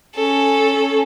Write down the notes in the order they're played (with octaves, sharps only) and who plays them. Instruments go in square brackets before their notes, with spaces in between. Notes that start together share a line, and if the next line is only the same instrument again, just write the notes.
[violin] C#4 A4